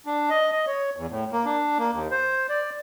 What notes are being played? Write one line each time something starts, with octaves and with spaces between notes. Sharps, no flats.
D4
D#5
D#5
C#5
E2
A2
A#3
D4
A#3
D#2
C5
D5